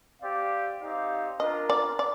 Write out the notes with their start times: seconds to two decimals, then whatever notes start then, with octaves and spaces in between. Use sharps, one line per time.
0.21 C4 G4 D5 F5
0.81 C4 D#4 G4 D5 F5
1.39 D4 F4 A#4 D#5
1.70 D5
1.99 D5